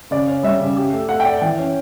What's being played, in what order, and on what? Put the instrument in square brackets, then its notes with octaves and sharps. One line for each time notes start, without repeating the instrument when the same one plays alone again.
[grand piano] C#3 [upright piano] D5
[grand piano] C#4
[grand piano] G3 [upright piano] E5
[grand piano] C#3
G4
A3
[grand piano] A3 [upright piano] F#5
[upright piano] G5
[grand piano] D5
[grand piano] E3 [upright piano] G5
[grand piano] C#4